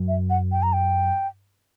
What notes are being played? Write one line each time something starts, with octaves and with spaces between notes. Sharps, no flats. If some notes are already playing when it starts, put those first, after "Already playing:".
Already playing: F#2
E5
F#5
G5
A#5
G5